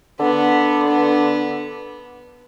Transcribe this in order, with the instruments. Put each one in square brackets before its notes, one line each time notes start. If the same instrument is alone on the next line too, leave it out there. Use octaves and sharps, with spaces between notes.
[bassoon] D3 [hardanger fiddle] B3
[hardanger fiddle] B3